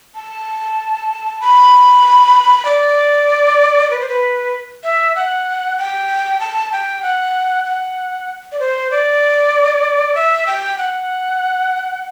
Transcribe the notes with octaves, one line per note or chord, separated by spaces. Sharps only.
A5
B5
D5
B4
C5
B4
E5
F#5
G5
A5
G5
F#5
F#5
D5
C5
D5
E5
G5
F#5